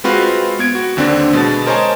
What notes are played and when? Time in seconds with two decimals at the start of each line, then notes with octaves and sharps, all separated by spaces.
0.04 G#3 C4 F4 F#4 B4 F5
0.59 B3 G#6 D7
0.75 F#4
0.97 D#2 D3 C4 D4
1.33 B2 G#3 B3 A6
1.66 A#4 C5 C#5 D#5 G#5 A5